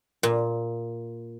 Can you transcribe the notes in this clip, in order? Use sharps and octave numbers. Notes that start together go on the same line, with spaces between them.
A#2